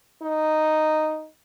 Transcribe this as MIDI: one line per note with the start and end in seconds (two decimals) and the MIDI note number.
0.23 1.25 63